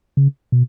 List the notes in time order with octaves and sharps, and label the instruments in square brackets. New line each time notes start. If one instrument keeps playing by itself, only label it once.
[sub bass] C#3
B2